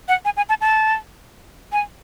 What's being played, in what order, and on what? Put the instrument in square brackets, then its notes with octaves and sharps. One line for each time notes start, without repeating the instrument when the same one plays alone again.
[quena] F#5
G#5
G#5
A5
A5
G#5